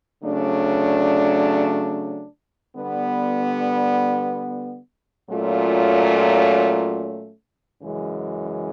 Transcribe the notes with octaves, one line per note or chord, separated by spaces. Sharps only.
C#3 F#3 A3 D4
D3 G3 B3
A#2 F#3 A3 C#4 F4
F#2 C#3 E3 G#3